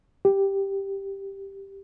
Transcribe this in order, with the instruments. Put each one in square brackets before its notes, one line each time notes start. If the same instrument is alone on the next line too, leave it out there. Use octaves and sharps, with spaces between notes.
[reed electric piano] G4